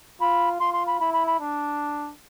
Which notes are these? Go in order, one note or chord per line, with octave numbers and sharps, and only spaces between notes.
F4 B5
F4 C6
C6
B5
E4 B5
B5
B5
D4